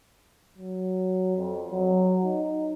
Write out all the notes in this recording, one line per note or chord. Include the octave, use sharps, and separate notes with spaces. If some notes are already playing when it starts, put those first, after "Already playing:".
F#3
F2
F#3
D#4